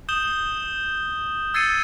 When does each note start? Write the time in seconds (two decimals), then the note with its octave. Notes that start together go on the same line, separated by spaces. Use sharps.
0.09 D#6 G6 E7 G7
1.54 E6 G#6 A6 C7 C#7 D#7